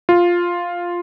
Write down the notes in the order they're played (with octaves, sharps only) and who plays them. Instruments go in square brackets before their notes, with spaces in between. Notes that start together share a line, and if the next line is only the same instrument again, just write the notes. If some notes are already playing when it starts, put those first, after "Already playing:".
[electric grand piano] F4